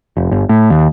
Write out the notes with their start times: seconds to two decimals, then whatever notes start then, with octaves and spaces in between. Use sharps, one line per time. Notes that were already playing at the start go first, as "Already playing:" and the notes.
0.17 F1
0.31 G1
0.49 A2
0.70 D#2